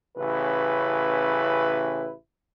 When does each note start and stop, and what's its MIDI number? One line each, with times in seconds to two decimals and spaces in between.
0.18 2.12 33
0.18 2.12 49
0.18 2.12 64
0.18 2.12 71